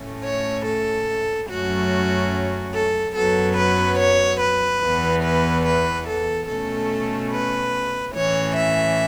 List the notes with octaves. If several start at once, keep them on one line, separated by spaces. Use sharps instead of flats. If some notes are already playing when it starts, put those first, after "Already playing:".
Already playing: A2 A3 C#4
C#5
A4
F#2 F#3 A3 C#4 F#4
A4
F#2 F#3 B3 A4
B4
C#5
B4
E2 E3 B3
B4
B4
A4
B2 A3 C#4 A4
B4
A2 E3 C#4 C#5
E5